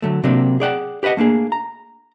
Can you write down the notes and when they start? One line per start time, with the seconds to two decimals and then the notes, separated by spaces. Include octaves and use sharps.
0.02 D3 F#3 A3
0.24 C3 F#3 A#3 C4 D4
0.60 G#4 D5 F#5 G5
1.03 G4 B4 D5 D#5 F#5
1.17 A3 A#3 D4 G#4
1.52 A#5